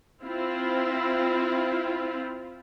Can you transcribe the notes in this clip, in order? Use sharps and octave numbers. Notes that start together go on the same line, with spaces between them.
C4 E4 F4